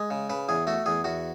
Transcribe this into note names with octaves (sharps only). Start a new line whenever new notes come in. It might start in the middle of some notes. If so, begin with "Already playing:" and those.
Already playing: G#3
C#3
C#3 B4
E2 G#4
A3 F#4
E2 G#4
E2 F#4